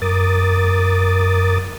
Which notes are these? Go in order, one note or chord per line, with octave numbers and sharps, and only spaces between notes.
F#2 A#4 D6 D#6 A6